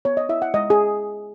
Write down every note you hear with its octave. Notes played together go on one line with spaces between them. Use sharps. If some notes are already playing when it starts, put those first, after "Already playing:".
B3 C#5
D#5
E4 E5
F#5
G#3 D#5
G#4